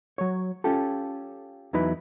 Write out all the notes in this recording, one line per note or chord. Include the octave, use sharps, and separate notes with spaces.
F#3 C#5
C#4 F4 G4 A4
E2 F#3 D#4 E4 B4